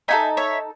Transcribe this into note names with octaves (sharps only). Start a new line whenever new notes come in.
D#4 F#4 A4 E5 G#5
C#5 E5